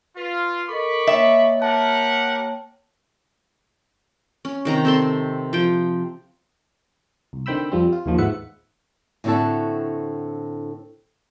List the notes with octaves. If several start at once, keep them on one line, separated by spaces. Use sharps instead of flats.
F4 B4
A4 A#4 D#5 B5 C#6 D6
A#3 C#5 D#5 E5 G5
G4 A#4 F#5 A5
C#4
C3 D#3 A#5
C4 A4 C6
F3 G5
C2
D3 D#3 C4 G5 B5 E6
F2 F3 G3 C4
F4
D#2 A#2 D#3 F3
D#2 G#2 B3 E5 F#5 C#7
A2 D3 C4 E4 F#4 A4